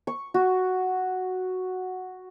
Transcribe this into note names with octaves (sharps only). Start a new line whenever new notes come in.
C#6
F#4